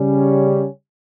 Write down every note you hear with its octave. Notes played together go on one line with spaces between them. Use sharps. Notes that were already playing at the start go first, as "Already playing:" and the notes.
Already playing: C#3 G3 C#4